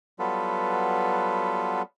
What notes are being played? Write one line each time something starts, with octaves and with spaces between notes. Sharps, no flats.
F#3 G3 B3 F4 A4 B4